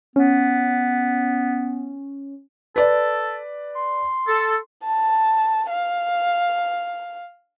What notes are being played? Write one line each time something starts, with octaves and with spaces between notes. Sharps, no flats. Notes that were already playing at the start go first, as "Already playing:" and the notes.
B3 C#4
A4 B4 D5
C6
A4
A5
F5